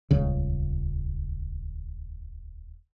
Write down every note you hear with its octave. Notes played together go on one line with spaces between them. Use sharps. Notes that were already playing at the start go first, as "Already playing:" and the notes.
D#1 C#2 C#3